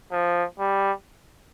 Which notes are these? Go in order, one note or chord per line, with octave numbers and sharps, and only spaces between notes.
F3
G3